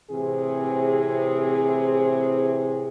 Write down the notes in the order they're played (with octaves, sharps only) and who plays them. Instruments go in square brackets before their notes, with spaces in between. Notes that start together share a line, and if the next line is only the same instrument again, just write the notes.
[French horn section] A2 C3 E3 C4 G#4